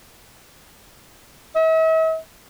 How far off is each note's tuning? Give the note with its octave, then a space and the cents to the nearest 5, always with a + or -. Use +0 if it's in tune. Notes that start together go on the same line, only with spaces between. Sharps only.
E5 -45